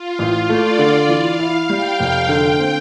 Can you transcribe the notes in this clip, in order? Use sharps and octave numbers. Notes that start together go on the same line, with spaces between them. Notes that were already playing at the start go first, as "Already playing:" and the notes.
Already playing: F4
A1 F4
A3 D5
D3
E3 F5
E4
G3 G5
F1
D3 G5
C4